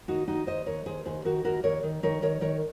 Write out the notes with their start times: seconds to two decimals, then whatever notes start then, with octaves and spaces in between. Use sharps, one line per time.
0.08 D#2 D#4 F#4
0.28 D#2 D#4 F#4
0.47 D#2 C5 D#5
0.66 D#2 A#4 C#5
0.86 D#2 G#4 C5
1.05 D#2 G#4 C5
1.25 D#3 F#4 A#4
1.45 D#2 F#4 A#4
1.64 D#2 A#4 C#5
1.83 D#3
2.03 D#3 A#4 C#5
2.22 D#3 A#4 C#5
2.41 D#3 A#4 C#5